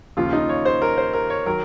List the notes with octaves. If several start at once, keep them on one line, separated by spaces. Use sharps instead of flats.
D#2 C#3 F3 F4
D#4
C#5
C5
A#4
C5
A#4
C#5
D#3 F#3 A#4